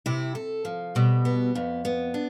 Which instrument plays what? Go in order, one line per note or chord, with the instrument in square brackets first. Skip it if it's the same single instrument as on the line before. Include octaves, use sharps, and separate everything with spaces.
[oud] C3 [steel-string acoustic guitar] E4
[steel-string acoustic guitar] A4
F3
[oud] B2 [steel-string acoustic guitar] G3
[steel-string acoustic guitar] B3
F2
B3
D4